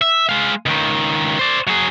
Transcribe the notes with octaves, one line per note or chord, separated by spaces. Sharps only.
E5
G#3 F5
C#2 D#3
C5 D5
F#3 G#4